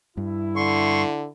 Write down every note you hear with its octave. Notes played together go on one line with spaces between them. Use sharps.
G2 E4
D3 C6 C#6